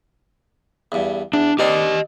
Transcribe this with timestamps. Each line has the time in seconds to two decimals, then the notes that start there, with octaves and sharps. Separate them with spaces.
0.92 E2 G2
1.33 E2 D4
1.59 D#3 C4 D4 G4 D#5